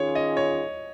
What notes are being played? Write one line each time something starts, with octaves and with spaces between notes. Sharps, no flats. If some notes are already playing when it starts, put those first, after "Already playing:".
Already playing: D#3 C#4 F4 G#4 C#5
D#5
C#5